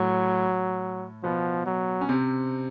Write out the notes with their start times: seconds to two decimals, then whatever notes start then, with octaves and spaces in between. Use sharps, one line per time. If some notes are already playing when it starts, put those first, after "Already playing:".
Already playing: A2 F#3 A3
1.24 B2 F3 B3
1.66 F#3
2.01 C#4
2.09 C3 C4